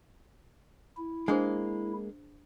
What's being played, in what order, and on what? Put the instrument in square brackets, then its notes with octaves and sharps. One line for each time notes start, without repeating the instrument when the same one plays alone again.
[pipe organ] E4
[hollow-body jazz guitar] G#3 A#3 [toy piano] D4 G#4 C5